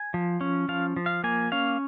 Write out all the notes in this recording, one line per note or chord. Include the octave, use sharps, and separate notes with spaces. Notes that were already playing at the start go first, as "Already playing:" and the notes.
Already playing: G#5
F3
C#4
F3 F5
F3
F5
A#3 G#5
C#4 F5